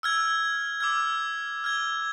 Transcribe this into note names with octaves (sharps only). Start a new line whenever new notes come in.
E6 F6 G#6
D6 E6 F6 G#6
F6 G#6 G7